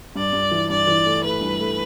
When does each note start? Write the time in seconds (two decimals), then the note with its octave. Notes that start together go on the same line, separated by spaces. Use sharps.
0.16 G2 D5
0.33 G2
0.51 E3
0.70 G2 D5
0.87 E3
1.06 A3
1.23 A3 B4
1.41 G2
1.59 A3